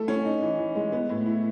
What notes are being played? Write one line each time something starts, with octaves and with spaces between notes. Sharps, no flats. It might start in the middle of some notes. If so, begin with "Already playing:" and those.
Already playing: A3 E4 A4
C#4
D#4
E3
E3
G#3
B3
A2
E4